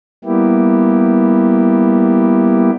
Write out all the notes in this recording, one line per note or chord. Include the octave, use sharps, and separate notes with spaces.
G3 A#3 B3 E4 G4